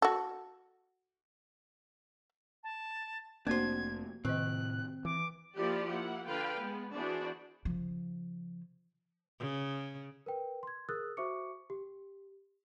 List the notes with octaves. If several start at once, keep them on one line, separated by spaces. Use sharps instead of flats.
F#4 A4
A5
F1 A3 A#3 C4 D4 F#4 C5 G#6
A2 C3 D#3 C4 D#5 F#6
E3 D6
F3 A#3 E4 G4 D5
A#3 E4 F#5
D3 F4 B4 F5 G5
G#3 B3
E3 B3 D4 F#4 G#4 C5
C#3 F3
C#3
A#4 B4 G5
C6 G#6
G#4 A#4 D#6 E6 F#6 A6
F#4 C5 E5 C#6 D6 C#7
G4